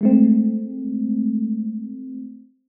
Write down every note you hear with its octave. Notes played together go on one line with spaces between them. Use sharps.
G#3 A3 C4